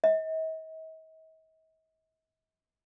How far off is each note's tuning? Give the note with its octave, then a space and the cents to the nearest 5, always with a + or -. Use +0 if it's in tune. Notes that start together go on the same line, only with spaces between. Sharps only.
D#5 +45